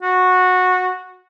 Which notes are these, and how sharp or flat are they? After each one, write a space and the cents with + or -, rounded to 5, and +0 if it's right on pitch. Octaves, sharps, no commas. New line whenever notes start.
F#4 -15